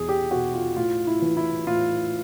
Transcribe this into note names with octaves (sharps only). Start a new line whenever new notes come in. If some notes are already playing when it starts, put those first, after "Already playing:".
Already playing: E2 B2 G#4
G4
B2 F#4
F4
A2 F4
E4
E3
E4
A2 F4